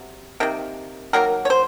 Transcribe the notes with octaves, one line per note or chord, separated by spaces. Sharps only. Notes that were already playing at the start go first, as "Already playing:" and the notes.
Already playing: C3 F#3
C3 D#3 A#3
D#3 F#3 A#3 A#4
C#5
C5